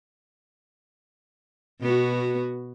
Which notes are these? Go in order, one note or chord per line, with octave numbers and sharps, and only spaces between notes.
B2 B3 F#4